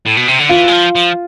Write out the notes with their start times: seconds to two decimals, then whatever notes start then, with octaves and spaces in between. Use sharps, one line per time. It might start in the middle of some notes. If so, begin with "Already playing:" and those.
0.06 A2
0.17 B2
0.28 C3
0.39 D3
0.49 E3 F4
0.68 G#3
0.72 F3
0.95 F3